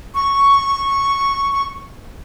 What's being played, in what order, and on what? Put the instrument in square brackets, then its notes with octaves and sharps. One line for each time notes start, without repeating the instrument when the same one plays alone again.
[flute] C#6
C#6